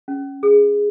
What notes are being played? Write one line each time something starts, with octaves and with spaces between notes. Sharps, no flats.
C#4
G#4